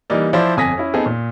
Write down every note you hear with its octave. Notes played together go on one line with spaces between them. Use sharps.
E3 G3 A#3 D#4 D5
F3 E4 C5 D5
G1 F2 G#5 D#6 A#6 B6
C#4 E4
B3 C4 D#4 G#4 A4
A#2